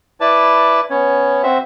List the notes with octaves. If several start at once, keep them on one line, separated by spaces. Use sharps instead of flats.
E4 B4 D5 A5
B3 C#4 C#5
C4 F#4 C5 E5